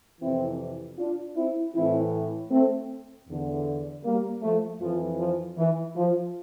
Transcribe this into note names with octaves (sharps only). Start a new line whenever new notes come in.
F2 C3 E3 C4 E4
D4 F4
C4 E4
A2 E3 C4 E4
A3 C4
E2 D3
G3 A#3
F3 A3
F2 E3 F3
F3
E3
F3